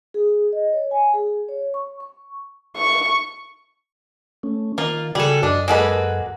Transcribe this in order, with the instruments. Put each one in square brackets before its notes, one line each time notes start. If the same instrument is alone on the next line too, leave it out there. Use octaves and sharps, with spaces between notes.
[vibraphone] G#4
D#5
C#5
G#5
G#4
C#5
C#6
C#6
[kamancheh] C#6
[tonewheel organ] A3 C#4
[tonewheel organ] D#3 [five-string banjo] A#3 [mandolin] F4
[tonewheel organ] C#3 F#4 [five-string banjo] G3 [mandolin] G#4 A4
[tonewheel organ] F#2 [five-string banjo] D4 [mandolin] D#5
[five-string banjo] G#3 A4 B4 [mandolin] A#3 F#4 G#4